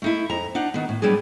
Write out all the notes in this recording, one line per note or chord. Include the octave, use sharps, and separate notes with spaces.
A3 D#4 E4
F2 A#5
D4 D#4 F#5
D#3 B3
A2
F#3 G3 B3 D4 G#4